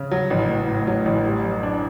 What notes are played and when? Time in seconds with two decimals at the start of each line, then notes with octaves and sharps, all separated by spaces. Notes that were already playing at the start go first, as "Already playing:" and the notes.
Already playing: C#3
0.11 F#3
0.30 A1
0.49 A1
0.68 A2
0.87 F#3
1.05 A1
1.25 G3
1.44 F#2
1.63 D4